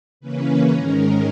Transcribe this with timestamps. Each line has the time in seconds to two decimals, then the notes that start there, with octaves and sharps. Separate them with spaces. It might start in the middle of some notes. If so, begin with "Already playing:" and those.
0.20 C#3 E3 A#3 C#4 B4
0.69 G#2 D#3 G#3 C#4 A#4